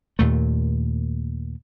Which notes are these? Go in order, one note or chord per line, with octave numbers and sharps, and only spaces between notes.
D#2 A#2 A3